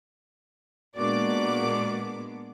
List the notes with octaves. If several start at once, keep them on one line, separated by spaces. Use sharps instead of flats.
A#2 G#3 A#3 B3 D4 F#4 D5 D6